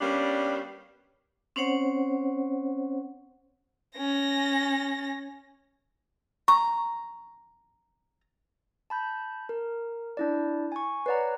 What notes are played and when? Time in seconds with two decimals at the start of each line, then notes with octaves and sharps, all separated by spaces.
0.01 G3 A#3 B3 C#4 D4
1.56 C4 C#4 C5 C#5 F#5
3.97 C#4 A#6
6.48 A#5 C#6
8.90 A5 B5 G6
9.49 A#4
10.17 D4 E4 D5
10.72 G#5 C#6
11.06 B4 C#5 D5 F#5 A#5